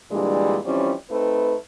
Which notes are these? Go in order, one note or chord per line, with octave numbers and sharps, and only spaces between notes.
A#2 D3 E3 G3 G#3 D4
E3 F3 G3 C4 C#4
A3 C4 D#4 B4